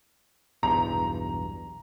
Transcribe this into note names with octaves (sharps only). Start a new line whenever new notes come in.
B1 E2 G2 A#5